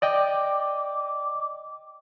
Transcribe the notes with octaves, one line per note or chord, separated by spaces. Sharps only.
D5 D#5 G5 D6